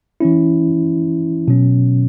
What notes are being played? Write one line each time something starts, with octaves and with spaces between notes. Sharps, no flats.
E3 C#4 E4
B2 F#3 C#4